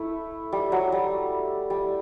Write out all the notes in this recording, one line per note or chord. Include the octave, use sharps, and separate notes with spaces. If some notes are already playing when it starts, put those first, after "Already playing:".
Already playing: A3 E4
G3
F#3
G3
G3